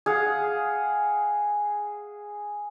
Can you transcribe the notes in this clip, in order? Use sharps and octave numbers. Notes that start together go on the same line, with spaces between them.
G#4 F5 F#5